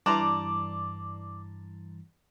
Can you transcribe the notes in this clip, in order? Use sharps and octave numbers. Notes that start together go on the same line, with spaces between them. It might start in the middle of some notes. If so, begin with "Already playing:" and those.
G2 E3 D5 A5 A#5 C6